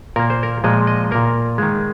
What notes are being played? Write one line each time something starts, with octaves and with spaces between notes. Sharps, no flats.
A#2 A#3 A#4
C5
A#4
A#2 F3 G#3 D#5
D#5
A#2 A#3 A#4
D#3 G#3